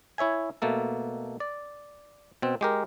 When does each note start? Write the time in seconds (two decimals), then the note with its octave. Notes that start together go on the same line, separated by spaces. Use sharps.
0.18 E4 C#5 E5 G#5
0.62 B2 A3 A#3 A4
1.40 D5
2.42 B2 C4
2.61 G#3 G4 A#4